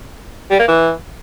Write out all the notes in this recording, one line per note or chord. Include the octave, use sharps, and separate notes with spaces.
G3
A#3
E3